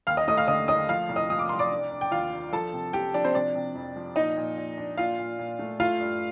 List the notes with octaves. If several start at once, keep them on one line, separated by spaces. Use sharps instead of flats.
D#2 F5 F6
D#5 D#6
A3 D#5 D#6
F5 F6
D3 D#5 D#6
A3 D#5 D#6
F3 F5 F6
C2
D#5 D#6
F3 D#6
D6
C2 C6
D5 D6
D4
D4
G5
D#2 F4 F5
D4
F3 A4 A5
C3
F3 G4 G5
F3 D4 D5
C4 C5
C3 D4 D5
C3
F2
F3
A#2 D#4 D#5
A#2
A#2
D4
A#2 F4 F5
A#2
A#2
A3
A3 F4 F5
G2